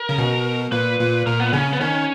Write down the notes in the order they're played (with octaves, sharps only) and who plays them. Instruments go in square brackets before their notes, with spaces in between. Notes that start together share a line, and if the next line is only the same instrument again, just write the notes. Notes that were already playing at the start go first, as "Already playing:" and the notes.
Already playing: [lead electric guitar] A#4
[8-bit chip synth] C#3
B2
[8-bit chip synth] A#2 [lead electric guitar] B4
[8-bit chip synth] A#2
[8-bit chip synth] A#2 [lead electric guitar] A#4
[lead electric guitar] B3
[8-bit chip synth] C#3 [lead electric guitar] C#4
[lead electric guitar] B3
[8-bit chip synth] D#3 [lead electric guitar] C#4